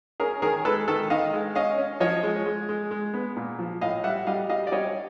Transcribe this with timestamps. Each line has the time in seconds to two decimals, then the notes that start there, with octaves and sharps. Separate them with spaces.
0.20 C#4 G#4 A#4
0.42 D#3 G#4 A#4
0.65 G#3 A4 B4
0.88 D#3 A4 B4
1.10 D#3 D#5 F5
1.33 G#3
1.55 C#4 D#5 F5
1.78 C#4
2.00 F3 C#5 D#5
2.23 G#3
2.46 G#3
2.69 G#3
2.91 G#3
3.14 B3
3.36 A#2
3.59 F3
3.81 A2 D#5 F5
4.04 G3 E5 F#5
4.27 G3 D#5 F5
4.49 G3 D#5 F5
4.67 D5
4.72 G3 C#5 D#5